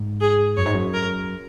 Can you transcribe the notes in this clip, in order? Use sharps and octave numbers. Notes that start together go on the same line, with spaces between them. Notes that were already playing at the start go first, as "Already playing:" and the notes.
Already playing: G#2
G#4
F#2 C#5
G#2
F#2
A#4